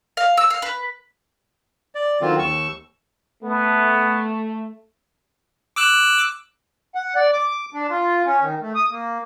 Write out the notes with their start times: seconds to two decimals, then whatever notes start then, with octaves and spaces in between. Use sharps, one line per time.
0.17 F5
0.37 E6
0.50 F5
0.62 B4
1.95 D5
2.22 D3 D#3 F#3 C4 F4
2.38 D#2 C#6 E6
3.44 A3 B3
5.76 D6 E6 F#6
6.95 F#5
7.16 D5
7.33 D6
7.74 D4
7.90 F4
8.25 C#4
8.40 D#3
8.61 A3
8.75 D#6
8.90 A#3